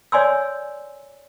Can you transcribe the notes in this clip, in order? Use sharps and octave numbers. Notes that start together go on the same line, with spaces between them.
C#5 D5 G#5 C6 E6